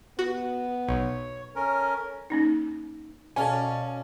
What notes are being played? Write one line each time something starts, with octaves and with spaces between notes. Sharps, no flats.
B3 F#4
B1 C#5
C#4 A4 A#4
A#3 C#4 D#4
B2 C#4 A4 D5 F5 G#5